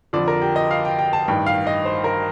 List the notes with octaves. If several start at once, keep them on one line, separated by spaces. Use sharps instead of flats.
F2 D3 F3 D5
A#4
G4
D#5
F5
G5
G5
A5
A1 G2 D#3 G5
F5
D#5
C5
A#4